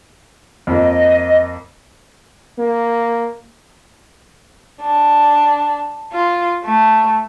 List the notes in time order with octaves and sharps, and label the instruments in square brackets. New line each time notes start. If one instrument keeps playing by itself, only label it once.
[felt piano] F2 A#3 [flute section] D#5
[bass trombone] A#3
[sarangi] D4
F4
A3